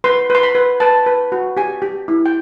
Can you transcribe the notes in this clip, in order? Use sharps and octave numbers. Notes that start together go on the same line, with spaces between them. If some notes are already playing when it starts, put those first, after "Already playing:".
B4 C6
B4 C6
B5
B4
B4 A5
B4
F#4
G4 G#5
G4
E4
G5